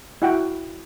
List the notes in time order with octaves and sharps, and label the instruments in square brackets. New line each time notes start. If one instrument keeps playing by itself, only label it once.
[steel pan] E4 F#4 F#5 G5